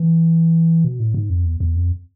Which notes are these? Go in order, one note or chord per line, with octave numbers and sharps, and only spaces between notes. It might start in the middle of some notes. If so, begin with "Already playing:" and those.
Already playing: E3
B2
A2
G#2
F2
E2
E2
F2